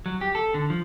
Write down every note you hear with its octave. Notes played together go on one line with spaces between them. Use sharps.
F#3
G4
A4
D3
F3